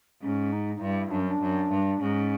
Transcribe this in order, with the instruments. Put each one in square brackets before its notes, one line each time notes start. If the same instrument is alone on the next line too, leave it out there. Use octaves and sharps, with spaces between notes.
[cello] G#2 [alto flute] C#4
[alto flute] D#4
D#4
[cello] G2 [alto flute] E4
[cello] F#2 [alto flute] D4
[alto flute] C#4
D4
[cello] F#2
G2
[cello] G#2 [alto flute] C#4